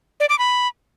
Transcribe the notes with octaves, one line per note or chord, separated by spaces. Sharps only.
D5
D6
B5